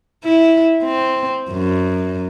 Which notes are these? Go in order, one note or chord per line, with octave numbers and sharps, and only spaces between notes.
E4
C4
F#2